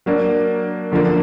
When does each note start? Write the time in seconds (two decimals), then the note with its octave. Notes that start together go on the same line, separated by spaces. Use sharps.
0.06 F#3 A#3 D4
0.91 F#2 D3 F3 A#3 D4